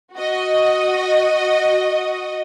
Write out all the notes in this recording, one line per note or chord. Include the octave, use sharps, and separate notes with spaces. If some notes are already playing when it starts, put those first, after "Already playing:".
F#4 D#5